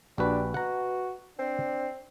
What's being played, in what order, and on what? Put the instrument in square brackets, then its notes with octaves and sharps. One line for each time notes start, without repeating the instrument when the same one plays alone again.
[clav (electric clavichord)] A#1 F#4 B4 [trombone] D4 [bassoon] G4
[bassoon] B2 [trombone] F#4 [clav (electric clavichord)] F#5 A#5
[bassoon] C4 [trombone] D4